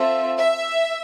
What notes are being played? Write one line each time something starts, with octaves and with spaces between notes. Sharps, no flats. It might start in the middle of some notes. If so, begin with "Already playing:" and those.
Already playing: C4 F4 A4 E5
E5